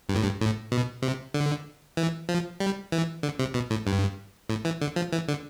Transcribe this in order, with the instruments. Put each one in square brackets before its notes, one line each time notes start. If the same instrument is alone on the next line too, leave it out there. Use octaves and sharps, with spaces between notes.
[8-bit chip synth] G2
A2
G2
A2
B2
C3
D3
E3
F3
G3
E3
D3
C3
B2
A2
G2
A2
E3
D3
F3
E3
D3